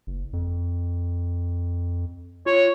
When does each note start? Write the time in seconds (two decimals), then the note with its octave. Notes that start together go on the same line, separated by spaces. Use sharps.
0.07 F#1
0.33 F2
2.46 F4 C#5